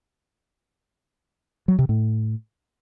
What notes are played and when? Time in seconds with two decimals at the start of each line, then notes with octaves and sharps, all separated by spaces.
1.68 F#3
1.79 C3
1.89 A2